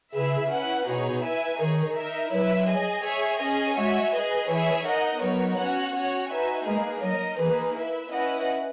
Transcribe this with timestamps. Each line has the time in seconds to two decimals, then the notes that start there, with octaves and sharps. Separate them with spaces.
0.14 C#3 E4 G#4 B4 E5
0.51 C#4 E4 B4 F#5
0.87 B2 B3 D#4 G#4 C#5
1.24 E4 B4 E5 G#5
1.60 D#3 D#4 G#4 C#5
1.96 D#4 A#4 E5
2.32 F#3 E4 B4 E5
2.68 G#4 D#5 G#5
3.04 G#4 C#5 E5 G#5
3.40 C#4 G#4 D#5 G#5
3.77 G#3 F#4 C#5 E5 G#5
4.13 G#4 B4 D#5 G#5
4.49 E3 E4 G#4 C#5 E5 G#5
4.85 D#4 A#4 D#5 F#5
5.21 F#3 B3 D#4 F#4 A#4 C#5
5.58 C#4 F#4 C#5 F#5
5.94 C#4 F#4 C#5 F#5
6.30 D#4 F#4 B4 E5 G#5
6.66 G#3 A#3 D#4 G#4 B4
7.02 F#3 D#4 A#4 D#5
7.38 E3 A#3 D#4 G#4 B4
7.74 E4 B4 E5
8.11 C#4 E4 B4 D#5 F#5